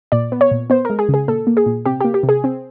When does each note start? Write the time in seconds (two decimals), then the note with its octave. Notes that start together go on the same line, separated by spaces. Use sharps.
0.12 A#2 D5
0.32 B3
0.41 C#5
0.51 A#2
0.70 B3 C5
0.85 G#3 A#4
0.99 G#4
1.09 C#3
1.14 G#4
1.28 A#2 A4
1.47 A#3
1.57 G#4
1.66 A#2
1.86 C3 G4
2.01 A#3 G4
2.14 G4
2.23 C3
2.29 G#4
2.44 C4